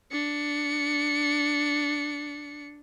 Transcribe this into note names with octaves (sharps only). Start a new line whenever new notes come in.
D4 C#7